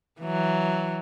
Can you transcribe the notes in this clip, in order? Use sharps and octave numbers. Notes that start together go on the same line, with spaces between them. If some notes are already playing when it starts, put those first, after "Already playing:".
E3 F#3